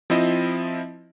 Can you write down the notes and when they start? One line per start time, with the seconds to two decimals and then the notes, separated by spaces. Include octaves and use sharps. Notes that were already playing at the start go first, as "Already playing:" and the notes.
0.10 F3 C4 E4 D#5